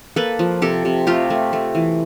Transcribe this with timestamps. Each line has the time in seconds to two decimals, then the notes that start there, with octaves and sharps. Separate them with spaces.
0.16 A#3 A4 B4
0.39 F3
0.62 C3 G4 A4
0.85 C3
1.07 A3 F4 G4
1.30 A3
1.53 A3
1.75 E3